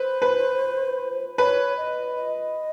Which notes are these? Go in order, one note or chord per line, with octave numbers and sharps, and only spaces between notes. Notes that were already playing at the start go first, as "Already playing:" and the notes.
Already playing: B4 C5
B4
B4 C#5
D#5
D#5